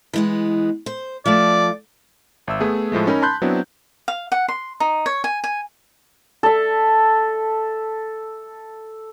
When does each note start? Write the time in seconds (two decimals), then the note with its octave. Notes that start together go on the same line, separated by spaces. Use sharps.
0.13 E3 G#3 B3
0.86 C5
1.26 F3 A3 D5
2.47 G#1 E5 E6
2.60 A3 B3 G#4
2.92 A2 F3 G#3 A3
3.07 C#4 D#4 A#4 G#5 B5
3.22 A5 B5 C6 F#6 G6
3.42 F#3 B3 C4 D4 E4
4.08 F5
4.32 F#5
4.48 C6
4.80 D#4
5.06 C#5
5.24 G#5
5.44 G#5
6.43 A4 E5